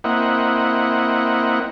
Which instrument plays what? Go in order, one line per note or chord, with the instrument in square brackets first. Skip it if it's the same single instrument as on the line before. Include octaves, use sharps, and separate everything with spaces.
[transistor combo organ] A#3 C4 E4 D#5 F#5